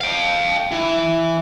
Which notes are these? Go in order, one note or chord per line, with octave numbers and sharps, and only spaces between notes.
F5 G5
E3